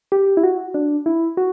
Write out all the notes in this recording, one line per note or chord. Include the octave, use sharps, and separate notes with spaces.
G4
E4
F#4
D4
E4
F#4